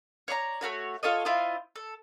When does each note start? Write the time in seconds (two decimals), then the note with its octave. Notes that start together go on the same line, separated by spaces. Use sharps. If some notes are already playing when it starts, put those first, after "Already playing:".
0.28 C#5 D5 E5 A#5
0.61 A3 B3 F#4 C#5
1.03 F4 A4 C#5 D#5
1.25 E4 F4 C5 D#5
1.76 A4